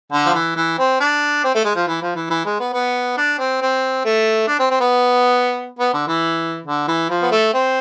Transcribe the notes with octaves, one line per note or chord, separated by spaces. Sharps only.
D3
F3
E3
E3
C4
D4
C4
A3
G#3
F3
E3
F3
E3
E3
G#3
B3
B3
D4
C4
C4
A3
D4
C4
C4
B3
B3
D3
E3
D3
E3
F3
B3
A3
C4